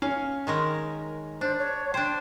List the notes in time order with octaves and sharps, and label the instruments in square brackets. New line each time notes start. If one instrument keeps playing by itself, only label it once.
[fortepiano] C#4 [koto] F5
[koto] D#3 G#3 A#4
[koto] D4 [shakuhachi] C5
[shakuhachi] C#5
[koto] D4 C5 [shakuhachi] G5